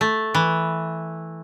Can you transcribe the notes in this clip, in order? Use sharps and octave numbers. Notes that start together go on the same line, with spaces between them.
A3
E3